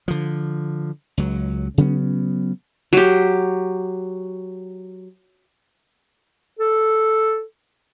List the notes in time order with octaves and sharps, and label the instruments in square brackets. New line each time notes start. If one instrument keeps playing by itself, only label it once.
[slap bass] D3 F3
C#2 F#3
C#3 F#3 B3 C#4
[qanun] F#3 G4
[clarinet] A4